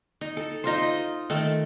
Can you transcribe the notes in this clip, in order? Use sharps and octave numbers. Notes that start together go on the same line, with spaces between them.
D#4
A4
D#4 F4 C5
D#5
D#3 A3 A4